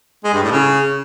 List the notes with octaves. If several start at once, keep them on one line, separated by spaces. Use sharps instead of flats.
G#3
G2
A2
C#3